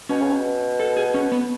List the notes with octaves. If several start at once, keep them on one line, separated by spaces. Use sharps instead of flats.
B2 C#4
C#3
B2
A4
G#4
C#4
B3